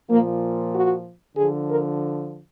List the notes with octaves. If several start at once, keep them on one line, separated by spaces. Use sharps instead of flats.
A#2 F3 A#3
F#4
D3 F3 G#4
A#4